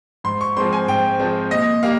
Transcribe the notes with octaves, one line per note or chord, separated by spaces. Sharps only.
G#2 C6
C#6
F3 G#3 C4 C6
G#5
G#2 G5
F3 G#3 C4
A#2 D#5
G3 A#3 F5